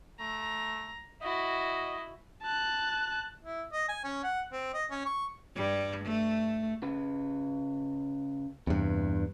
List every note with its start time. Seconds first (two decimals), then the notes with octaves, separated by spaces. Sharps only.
0.20 A3 A#5
1.22 E4 F#4 D#5
2.42 A5 F#6
3.43 E4
3.73 D#5
3.89 G#5
4.04 C#4
4.24 F#5
4.52 C4
4.74 D#5
4.91 C#4
5.05 C#6
5.55 G2 G3
6.05 A3
6.83 C#3 B4
8.67 E2 G2 C3